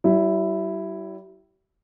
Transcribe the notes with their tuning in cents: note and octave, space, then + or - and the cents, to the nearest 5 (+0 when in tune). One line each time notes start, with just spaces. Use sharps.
G3 -40 E4 +5